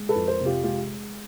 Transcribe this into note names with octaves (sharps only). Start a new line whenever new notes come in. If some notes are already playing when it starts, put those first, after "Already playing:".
Already playing: G#3
A4 B4
F2
A#4 C5
C3
F4 G4
G#3 F4 G4